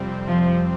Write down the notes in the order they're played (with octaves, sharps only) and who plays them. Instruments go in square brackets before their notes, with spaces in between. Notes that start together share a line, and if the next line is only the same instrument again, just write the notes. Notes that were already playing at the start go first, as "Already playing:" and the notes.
Already playing: [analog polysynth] F2 C3 G3 C4
[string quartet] F3